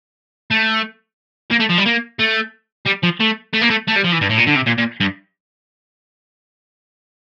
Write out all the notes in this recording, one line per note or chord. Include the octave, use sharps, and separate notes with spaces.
A3
A#3
A3
F3
G3
A#3
A3
G3
F3
A3
A3
A#3
A3
A3
G3
F3
E3
G2
A2
A#2
D3
C3
A#2
A#2
G2